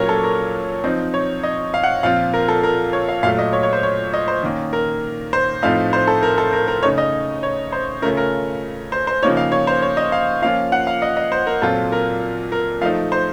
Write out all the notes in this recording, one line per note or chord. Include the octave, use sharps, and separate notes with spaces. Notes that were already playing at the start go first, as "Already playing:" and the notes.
Already playing: A#2 F#3 A#3 C#4 F4 A#4 C#5
A4
A#4
F3 C4 D#4
C#5
D#5
F5
F#5
A#2 F3 C4 F4 F5
A#4
A4
A#4
C#5
F5
A#2 F#3 A3 F5
D#5
C#5
C#5
C5
C#5
D#5
C5
D#3 A#3 C#4
A#4
C5
A2 F3 A3 C4 D#4 F5
C5
A4
A#4
A4
A#4
A#4
C#3 A3 D#4 C#5
D#5
C#5
C5
C#3 A3 C#4 F4 A#4
A#4
C5
C5
C#3 F3 A#3 D#4 C#5
F5
C#5
C5
C#5
D#5
F5
F3 A#3 C#4 F4 F5
F#5
F5
D#5
D#5
C5
A#4
A#2 F#3 C4 F4 A4
A#4
A#4
F3 A3 D#4 F5
C5